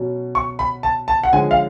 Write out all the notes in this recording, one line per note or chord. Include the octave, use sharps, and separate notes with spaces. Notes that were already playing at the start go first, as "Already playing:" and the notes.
Already playing: B2 F#3 C#4
C#6
B5
A5
A5
F#5
D3 F3 G#3 C#4 G#5
F5